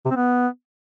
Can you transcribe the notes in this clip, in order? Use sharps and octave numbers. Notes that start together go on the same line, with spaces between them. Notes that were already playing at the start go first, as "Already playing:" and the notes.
C3
C4
B3